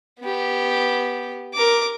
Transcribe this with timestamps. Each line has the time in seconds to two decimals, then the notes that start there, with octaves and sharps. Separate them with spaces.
0.20 B3 G4
1.54 A#4 D6